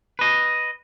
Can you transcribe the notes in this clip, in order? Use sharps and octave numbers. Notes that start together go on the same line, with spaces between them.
B4 D#5